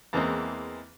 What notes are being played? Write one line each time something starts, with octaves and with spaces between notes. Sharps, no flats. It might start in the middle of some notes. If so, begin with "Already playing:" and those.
E2 E3 G#3 A#3 C4